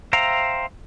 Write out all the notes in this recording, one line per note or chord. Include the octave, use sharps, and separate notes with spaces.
C5 E5 F5 G5 A#5